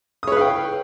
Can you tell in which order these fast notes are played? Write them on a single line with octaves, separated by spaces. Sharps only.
D#6 C#5 B4 F5 G5